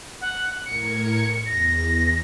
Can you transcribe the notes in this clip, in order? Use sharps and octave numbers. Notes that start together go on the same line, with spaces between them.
F#5
A2 A#4 G#6 C#7
E2 A#6